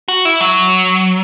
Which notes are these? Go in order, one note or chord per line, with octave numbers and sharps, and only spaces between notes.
F#4
E4
F#3